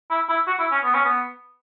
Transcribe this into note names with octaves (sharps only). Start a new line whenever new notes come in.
E4
E4
F#4
E4
C#4
B3
C#4
B3